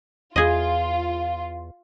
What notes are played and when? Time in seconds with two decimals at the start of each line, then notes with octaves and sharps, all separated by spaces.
0.36 E2 F4 G#4 D#5